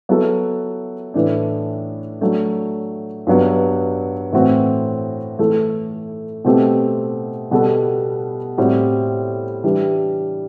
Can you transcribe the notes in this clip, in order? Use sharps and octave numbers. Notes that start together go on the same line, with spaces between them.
F#3 B3 E4 A4
A2 E3 A3 D4
F#3 A3 D4
G2 F#3 B3
A2 E3 A3 C4 F#4
E3 A3 E4 A4
B2 A3 C4 E4 G4
B2 G3 B3 F#4 A4
A2 G3 C4 F#4
E3 G3 D4